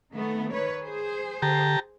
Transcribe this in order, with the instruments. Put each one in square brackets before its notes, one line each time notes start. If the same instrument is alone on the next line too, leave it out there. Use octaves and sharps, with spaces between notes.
[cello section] D#3 A3 B3
D#3 B4 C#5
G#4 C5
[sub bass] D3 [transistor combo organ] G4 A5 A#5